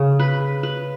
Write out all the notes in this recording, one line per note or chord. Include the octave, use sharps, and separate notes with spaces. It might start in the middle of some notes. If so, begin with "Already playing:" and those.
Already playing: C#3
B4
B4